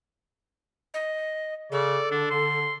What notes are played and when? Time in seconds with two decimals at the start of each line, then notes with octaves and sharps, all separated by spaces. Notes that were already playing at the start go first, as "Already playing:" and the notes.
0.94 D#5
1.72 C#3 A4 D5
2.11 D3 D4
2.30 D3 C6